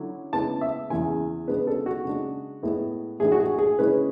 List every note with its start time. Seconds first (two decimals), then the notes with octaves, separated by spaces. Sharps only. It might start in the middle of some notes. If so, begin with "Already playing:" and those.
Already playing: D3 F#3 C#4 E4
0.33 C#3 G#3 B3 E4 A5
0.61 E5
0.90 E2 C#3 E3 G#5
1.48 C#3 G#3 B3 D4 B4
1.67 A4
1.86 F#4
2.05 C#3 G#3 D4
2.63 A2 G#3 B3 E4
3.20 A2 E3 G#3 D4 G#4
3.32 F#4
3.40 G#4
3.58 G#4
3.78 C#3 G#3 C#4 E4 B4